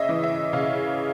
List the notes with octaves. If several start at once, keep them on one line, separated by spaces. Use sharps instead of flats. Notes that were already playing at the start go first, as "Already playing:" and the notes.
Already playing: C#3 D#5 E5
E3
E5
C#3 F5